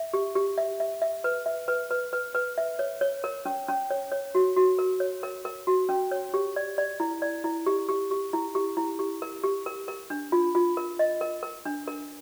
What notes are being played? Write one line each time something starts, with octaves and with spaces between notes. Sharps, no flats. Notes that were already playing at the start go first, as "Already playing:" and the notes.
Already playing: E5
G4
G4
E5
E5
E5
B4
E5
B4
B4
B4
B4
E5
C#5
C#5
A#4
C#4
C#4
C#5
C#5
F#4
F#4
A#4
C#5
A#4
A#4
F#4
C#4
C#5
G4
D5
D5
E4
D5
E4
G4
G4
G4
E4
G4
E4
G4
A#4
G4
A#4
A#4
D4
F4
F4
A#4
D#5
A#4
A#4
D4
A#4